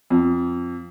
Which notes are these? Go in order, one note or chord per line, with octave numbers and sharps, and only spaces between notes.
F2